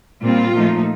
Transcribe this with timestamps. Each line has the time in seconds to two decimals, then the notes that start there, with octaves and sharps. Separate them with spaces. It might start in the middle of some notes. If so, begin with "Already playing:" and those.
0.23 A#2 G3 C4 F4
0.54 A#2 F3 A3 D#4